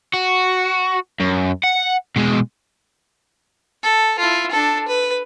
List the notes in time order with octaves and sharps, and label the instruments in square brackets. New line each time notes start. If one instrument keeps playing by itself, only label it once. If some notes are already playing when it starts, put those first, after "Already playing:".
[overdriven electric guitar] F#4
F#2
F#5
B2 G#3
[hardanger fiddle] A4
E4 F4
D4 A4
B4